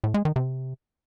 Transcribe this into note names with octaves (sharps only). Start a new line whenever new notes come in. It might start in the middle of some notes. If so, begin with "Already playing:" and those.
A2
G#3
D#3
C3